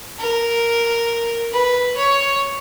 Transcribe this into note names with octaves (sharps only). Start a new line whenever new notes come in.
A#4
B4
C#5